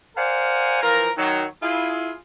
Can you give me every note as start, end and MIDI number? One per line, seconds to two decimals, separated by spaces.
0.16 0.79 70
0.16 0.79 72
0.16 0.79 74
0.16 0.79 77
0.16 0.79 78
0.16 0.79 80
0.82 1.10 52
0.82 1.10 53
0.82 1.10 65
0.82 1.10 70
1.17 1.44 51
1.17 1.44 54
1.62 2.14 64
1.62 2.14 65
1.62 2.14 68